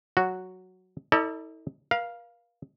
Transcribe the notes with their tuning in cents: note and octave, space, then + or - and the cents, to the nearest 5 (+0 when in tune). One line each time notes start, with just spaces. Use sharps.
F#3 +0 F#4 +0
E4 -45 A4 +30 D5 +10
A#4 +45 F5 +0